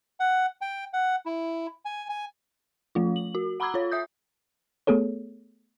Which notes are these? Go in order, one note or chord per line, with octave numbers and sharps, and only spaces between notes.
F#5
G5
F#5
E4
G#5
G#5
F3 A3 F4
F#7
F#4
F#5 A#5 B5 D6 E6 G#6
F4 C#5
E5 D#6 G6
A3 B3 G#4 A4 C#5